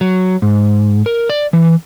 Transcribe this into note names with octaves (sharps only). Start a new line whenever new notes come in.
F#3
G#2
A#4
D5
E3